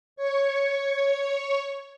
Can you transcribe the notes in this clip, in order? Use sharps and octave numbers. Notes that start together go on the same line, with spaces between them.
C#5 C#6